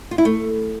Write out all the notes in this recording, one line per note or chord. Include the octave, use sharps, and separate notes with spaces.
F4
E4
A3